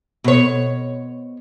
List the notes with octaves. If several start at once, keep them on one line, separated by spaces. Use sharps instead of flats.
B2 C#5